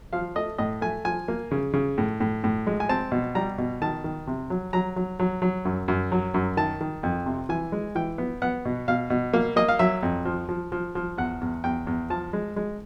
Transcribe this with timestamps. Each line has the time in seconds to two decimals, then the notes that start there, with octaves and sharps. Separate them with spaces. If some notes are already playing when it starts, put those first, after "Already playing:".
0.13 F3 F5
0.35 A3 D#5
0.58 A2 D#5
0.82 A3 G#5
1.05 F3 G#5
1.28 A#3
1.51 C#3
1.73 C#3
1.98 A2
2.20 A2
2.44 A2
2.67 G#3
2.80 G#5
2.89 C4 A5
3.12 B2
3.35 G3 A#5
3.58 B2
3.82 D#3 A5
4.04 D#3
4.27 C3
4.50 F#3
4.73 F#3 A#5
4.96 F#3
5.20 F#3
5.42 F#3
5.65 F#2
5.88 F#2
6.12 F#3
6.34 F#2
6.57 D#3 A5
6.81 D#3
7.03 F2
7.26 C3
7.49 E3 G#5
7.72 G#3
7.95 E3 G5
8.18 B3
8.42 B3 F#5
8.65 B2
8.88 B2 F5
9.10 B2
9.34 A#3 F5
9.56 A#3 D#5
9.68 F5
9.79 F#3 E5
10.03 F2
10.25 F3
10.49 F3
10.72 F3
10.95 F3
11.18 E2 F#5
11.41 E2
11.64 E2 G5
11.87 E2
12.10 F3 A5
12.33 G#3
12.56 G#3